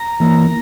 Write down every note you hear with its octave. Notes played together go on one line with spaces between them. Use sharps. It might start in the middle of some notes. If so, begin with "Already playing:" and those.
Already playing: A#5
E3 A#3